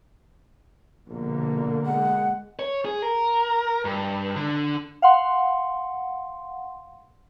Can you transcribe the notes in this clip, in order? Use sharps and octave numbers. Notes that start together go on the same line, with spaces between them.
A#1 B2 D3 A#3
G#3 F#5
C#5
G#4
A#4
G2
D3
F5 F#5 C6